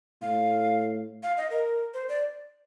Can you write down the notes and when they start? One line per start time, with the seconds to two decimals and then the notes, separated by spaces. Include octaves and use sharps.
0.22 A2 F5
1.23 F5
1.37 D#5
1.50 A#4
1.94 C5
2.09 D5